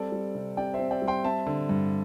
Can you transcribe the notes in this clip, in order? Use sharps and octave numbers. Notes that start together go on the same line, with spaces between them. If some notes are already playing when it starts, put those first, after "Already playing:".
Already playing: G3 C4 A4 D5
G3
C3
C3 D5 G5
C5 E5
C4
D5 G5
G3
G5 C6
C4 E5 A5
D3
G2